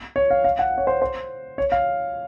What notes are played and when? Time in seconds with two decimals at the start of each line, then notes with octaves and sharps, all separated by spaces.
0.16 C#5
0.30 F5
0.44 F5
0.59 F#5
0.78 C#5
0.87 C5
1.02 C5
1.58 C#5
1.72 F5